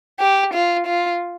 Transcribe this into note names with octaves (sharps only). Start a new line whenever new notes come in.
G4
F4
F4